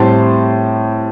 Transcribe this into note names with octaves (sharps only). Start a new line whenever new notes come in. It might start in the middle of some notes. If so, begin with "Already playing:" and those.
Already playing: A2 G3 C4 A5 C6